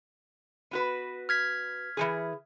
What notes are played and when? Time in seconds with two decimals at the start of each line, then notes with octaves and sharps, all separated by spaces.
0.71 B3 F#4 B4
1.29 F6 G#6 B6
1.97 E3 F3 G#4